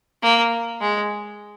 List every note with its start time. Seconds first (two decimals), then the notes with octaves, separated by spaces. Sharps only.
0.22 A#3
0.81 G#3